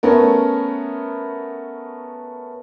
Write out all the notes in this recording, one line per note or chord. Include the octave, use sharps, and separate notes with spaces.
A3 B3 C#4 A#4